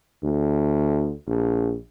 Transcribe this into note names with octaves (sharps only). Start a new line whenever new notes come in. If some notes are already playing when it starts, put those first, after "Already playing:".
D2
A#1